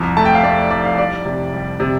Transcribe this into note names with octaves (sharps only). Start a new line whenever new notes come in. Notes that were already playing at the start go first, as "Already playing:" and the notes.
Already playing: C2 F2
A3 A5
G5
F5
A3 D5
F1 D5
F5
G3 D5
C3
G3
C3